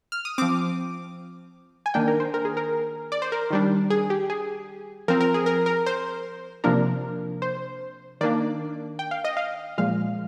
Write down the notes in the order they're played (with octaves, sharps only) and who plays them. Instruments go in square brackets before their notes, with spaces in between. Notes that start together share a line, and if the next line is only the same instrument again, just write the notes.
[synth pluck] F6
D#6
F3 C4 D6
G#5
D#3 A#3 D4 G5
A#4
C5
A#4
G#4
A#4
D5
C5
A#4
D#3 G3 D4
G#4
G4
G#4
F3 C4 A#4
A#4
G#4
A#4
A#4
C5
C3 F3 A#3 D4 A#4
C5
D#3 A#3 D4 D5
G5
F5
D#5
F5
A#2 F3 G#3 F5